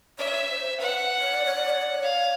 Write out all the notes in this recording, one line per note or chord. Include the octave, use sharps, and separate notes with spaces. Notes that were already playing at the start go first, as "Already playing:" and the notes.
C#5 E5
C5
B4 F#5
C#5
D5
C#5
D5
C#5
D5
C#5
F5